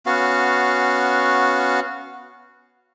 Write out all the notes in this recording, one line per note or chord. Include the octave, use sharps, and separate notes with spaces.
B3 C#4 F#4 F5